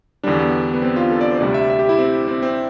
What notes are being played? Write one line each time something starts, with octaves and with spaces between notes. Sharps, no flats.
E2 D3 G3 D4
B3
B3
C4
F4
A4
D5
C5
D2 C3 G3 D5
E5
E5
G4
E4
C4
C4
C4